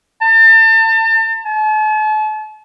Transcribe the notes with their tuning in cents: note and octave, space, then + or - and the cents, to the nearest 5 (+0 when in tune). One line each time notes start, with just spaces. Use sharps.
A5 +35
A5 -40